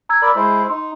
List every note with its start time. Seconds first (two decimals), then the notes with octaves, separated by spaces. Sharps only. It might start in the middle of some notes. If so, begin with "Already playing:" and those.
0.09 A#5 E6 G#6
0.22 A#4 D5 B5 E6
0.36 G#3 E4 C5
0.70 D#4 C6